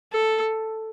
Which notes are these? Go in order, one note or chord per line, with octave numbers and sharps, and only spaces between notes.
A4